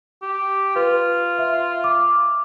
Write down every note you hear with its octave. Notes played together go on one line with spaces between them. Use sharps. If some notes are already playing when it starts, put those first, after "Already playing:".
G4
F4 B4
E5
D6